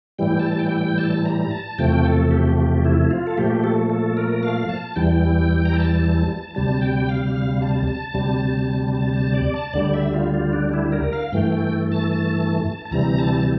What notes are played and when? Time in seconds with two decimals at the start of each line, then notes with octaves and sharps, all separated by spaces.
0.19 A2 E3 G3 G5
0.39 A5
0.59 G5
0.78 G5
0.98 A5
1.26 A#5
1.41 A#5
1.51 A5
1.78 E2 C3 F3 A3 G5
2.05 A4
2.31 G4
2.58 G4
2.85 E4
3.11 F4
3.27 A4
3.38 A#2 F3 A3 G4
3.64 A4
3.90 A4
4.17 A#4
4.43 F5
4.69 A5
4.96 E2 E3 G3 G5
5.65 A#5
5.76 A5
6.55 D2 C3 G3 A5
6.81 G5
7.09 F5
7.35 F5
7.62 A5
7.87 A5
8.14 D2 C3 G3
8.95 A5
9.13 A5
9.34 D5
9.54 A5
9.74 D2 D3 G3 D5
9.93 E5
10.13 F4
10.34 F4
10.53 D4
10.69 D4
10.73 E4
10.92 A#4
11.13 F5
11.32 G2 E3 A3 G5
11.52 G5
11.92 A5
12.12 A5
12.85 A5
12.91 D2 C3 E3 G3 A#5
13.19 A5